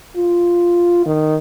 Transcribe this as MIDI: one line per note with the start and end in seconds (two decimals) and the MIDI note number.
0.16 1.04 65
1.06 1.36 51